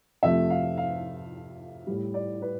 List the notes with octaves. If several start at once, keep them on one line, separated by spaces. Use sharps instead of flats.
F2 C3 F3 A3 E5
F5
F5
A2 G3
D5
B4